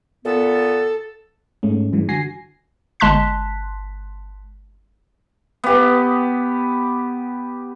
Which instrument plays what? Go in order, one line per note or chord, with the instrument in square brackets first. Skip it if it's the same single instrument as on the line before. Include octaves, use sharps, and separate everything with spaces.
[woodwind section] A#2 B3 [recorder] A4
[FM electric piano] G#2 G#3 A3 C#4
G2 E3 F#3 G#3
D3 F#4 G#5 A#6 C7
[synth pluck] G1 G#3 A5 C6 F#6 B6
[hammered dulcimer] B3 G4